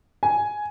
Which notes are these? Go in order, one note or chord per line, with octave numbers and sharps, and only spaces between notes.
G#5